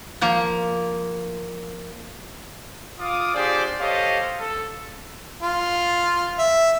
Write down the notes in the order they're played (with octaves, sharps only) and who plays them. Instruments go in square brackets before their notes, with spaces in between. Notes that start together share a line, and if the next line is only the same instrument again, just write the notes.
[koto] F3 A#3
[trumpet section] F4 F5 D6 D#6
D4 F4 G4 G#4 C5 D5
G4 A4 C5 C#5 D#5 F5
A4
[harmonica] F4
E5